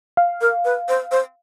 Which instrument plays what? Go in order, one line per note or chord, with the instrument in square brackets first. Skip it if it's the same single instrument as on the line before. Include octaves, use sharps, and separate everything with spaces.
[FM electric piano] F5
[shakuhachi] A#4
B4
C5
C5